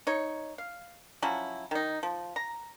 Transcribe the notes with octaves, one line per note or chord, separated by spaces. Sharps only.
D#4 C#5
F5
F3 F#3 C#4 E4
D#3 D#4
F3
A#5